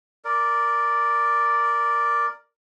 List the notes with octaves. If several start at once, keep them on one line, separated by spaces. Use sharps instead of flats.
A#4 D5